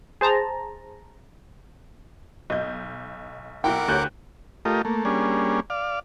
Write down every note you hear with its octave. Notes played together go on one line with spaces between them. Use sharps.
G#4 C5 A5 A#5
B1 D#5 G6
B1 E4 A#4 F#5 G5 D6
D2 A3 G4 C#5 F#6 G6
A3 F4 G4 A#4 D#5
A3 A#3
G3 A#3 C#4 D4 G#4
D5 F5